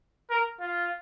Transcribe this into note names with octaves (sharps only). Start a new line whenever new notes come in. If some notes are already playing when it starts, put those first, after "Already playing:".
A#4
F4